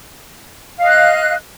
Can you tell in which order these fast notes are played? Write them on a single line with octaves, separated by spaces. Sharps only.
F5 D#5 F#6